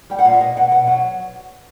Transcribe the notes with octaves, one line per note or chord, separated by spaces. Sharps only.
G3 G5
F#5
A#2 F5
E5
B2 D#5
B2 F#5
B2 F#5
F#3 F#5